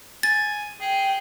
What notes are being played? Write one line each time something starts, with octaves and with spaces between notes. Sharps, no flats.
G#5 A6
G#4 G5